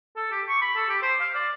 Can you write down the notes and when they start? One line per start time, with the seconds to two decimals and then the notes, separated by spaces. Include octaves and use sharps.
0.16 A4
0.32 G4
0.49 C#6
0.62 B5
0.76 A4
0.89 G4
1.02 C5
1.20 F5
1.35 D5